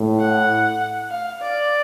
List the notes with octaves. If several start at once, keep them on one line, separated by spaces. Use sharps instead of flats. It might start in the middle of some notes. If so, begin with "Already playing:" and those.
Already playing: A2
F#5
F5
D5